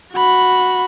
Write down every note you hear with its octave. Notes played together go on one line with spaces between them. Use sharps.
F#4 B5